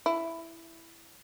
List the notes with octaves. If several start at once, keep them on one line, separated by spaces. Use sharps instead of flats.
E4